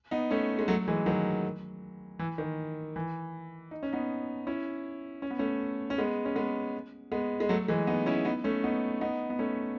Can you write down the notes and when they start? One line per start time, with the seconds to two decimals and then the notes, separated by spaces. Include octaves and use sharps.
0.11 B3 D#4
0.31 A3 C#4
0.59 G#3
0.68 F#3 A3
0.88 E3 G#3
1.06 D#3 F#3
2.19 E3
2.38 D#3
2.96 E3
3.71 D#4
3.83 C#4
3.93 B3 D#4
4.47 C#4 E4
5.22 C#4
5.31 B3
5.39 A3 C#4
5.90 C#4
5.98 G#3 B3
6.25 C#4
6.36 G#3 B3
7.12 G#3 B3
7.40 G#3
7.49 F#3 A3
7.68 E3 G#3
7.87 B3 D#4
8.06 C#4 E4
8.25 B3 D#4
8.44 A3 C#4
8.64 B3 D#4
9.01 B3 D#4
9.30 B3
9.39 A3 C#4